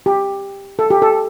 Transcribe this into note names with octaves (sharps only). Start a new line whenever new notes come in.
G4
A4
G4
A4